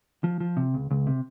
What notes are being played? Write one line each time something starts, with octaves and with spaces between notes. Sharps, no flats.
F3
F3
C3
C#2
C#2
C3